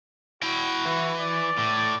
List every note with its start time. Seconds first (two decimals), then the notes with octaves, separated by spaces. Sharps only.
0.43 E4 F#4 G5
0.86 E3
1.19 D5
1.58 A2